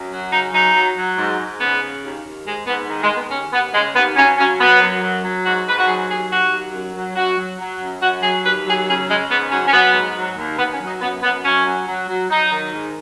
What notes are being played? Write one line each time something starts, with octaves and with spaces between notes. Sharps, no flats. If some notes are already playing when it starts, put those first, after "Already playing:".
Already playing: F#2
F#3
C#3 D#4
F#3 D#4
F#3
F#3
G#2
G#2
C#3 B3
C#3
D#2
D#2
G#2 G#3
G#2 B3
D#3
G#3
D#3
B3
D#2 C#4
D#2 B3
C#3 G#3
D#2 B3
F#3 C#4
F#3 C#4
F#3 B3
F#2
F#3
F#3
G#2 F#4
G#2 B4
F#4
F#3 G#4
D#2 G#4
D#2 F#4
F#3
F#2
F#3
F#2 F#4
F#3
F#3
F#2
F#2 F#4
F#3 G#4
D#2 B4
F#3 G#4
C#3 G#4
C#3 G#3
G#2 B3
F#3 C#4
C#4
F#3 B3
G#2
F#3
D#2
D#2 B3
C#4
F#3
D#4
F#2 B3
F#2 B3
F#2 C#4
F#3
F#3
F#3
F#3 D#4
D#3
G#2